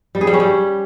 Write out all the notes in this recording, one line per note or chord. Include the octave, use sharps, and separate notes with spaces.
G3
G#4
G3
C#4
G3